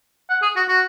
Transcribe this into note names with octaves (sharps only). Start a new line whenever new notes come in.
F#5
G#4
F#4
F#4